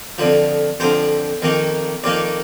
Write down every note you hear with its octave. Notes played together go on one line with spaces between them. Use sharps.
F2 D3 F3
F2 D3 F3 C5
F2 D#3 A#3 D#4
F2 D#3 A#3 D#4 D5